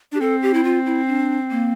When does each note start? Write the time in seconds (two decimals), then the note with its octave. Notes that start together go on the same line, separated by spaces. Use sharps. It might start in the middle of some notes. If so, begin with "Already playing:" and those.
0.12 D4 G4
0.21 C4 A4
0.42 G4
0.54 E4
0.64 F4
0.86 E4
1.08 D4
1.50 A#3